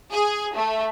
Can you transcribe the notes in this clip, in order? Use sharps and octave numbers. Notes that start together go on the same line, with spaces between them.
G#4
A3